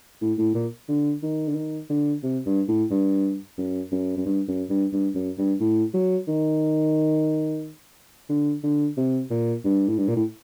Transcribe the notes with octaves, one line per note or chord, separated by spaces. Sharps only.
A2
A2
A#2
D3
D#3
D3
D#3
D3
C3
G2
A2
G2
F#2
F#2
F#2
G2
F#2
G2
G2
F#2
G2
A2
F#3
D#3
D3
D3
C3
A#2
G2
A2
G2
A#2
A2